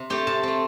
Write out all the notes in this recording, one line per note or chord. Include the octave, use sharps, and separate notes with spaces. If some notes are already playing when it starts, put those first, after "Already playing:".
Already playing: C3
A3 C4 G4
C3 A5
A3 C4